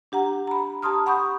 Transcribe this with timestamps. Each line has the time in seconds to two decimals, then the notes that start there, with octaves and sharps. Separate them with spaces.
0.12 D4 G4 F#5 A#5
0.47 A#5 B5
0.82 G4 A5 A#5 C6 D#6 F6
1.06 F#5 B5 C#6 D#6 G6